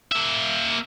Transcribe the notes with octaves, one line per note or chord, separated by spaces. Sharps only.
A#3 E5